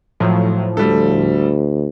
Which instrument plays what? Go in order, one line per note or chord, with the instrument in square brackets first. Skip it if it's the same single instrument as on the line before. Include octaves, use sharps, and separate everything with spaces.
[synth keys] A2 F3 [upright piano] F#3
[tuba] D2 [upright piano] G3 A4